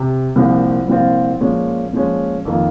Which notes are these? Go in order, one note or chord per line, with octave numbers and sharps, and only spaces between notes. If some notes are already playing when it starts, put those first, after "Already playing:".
Already playing: C3
C2 A#2 F3 C4 F4
C2 A#2 F3 C4 F4
A#2 F3 G#3 C#4
A#2 F3 G#3 C#4
F2 D#3 A#3 F4